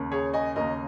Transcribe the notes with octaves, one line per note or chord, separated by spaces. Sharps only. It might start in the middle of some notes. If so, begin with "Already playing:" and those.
Already playing: D#2 C#3 A#3
G#4 C#5
D#5 G#5
D#2 C#3 A#3 A#4 D#5